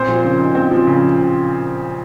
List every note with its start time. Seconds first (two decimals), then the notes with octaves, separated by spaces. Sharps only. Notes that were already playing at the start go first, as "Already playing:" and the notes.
Already playing: A#2 C4 C5
0.08 F3
0.25 C#3
0.40 D#4
0.55 C4
0.71 F3
0.87 C#3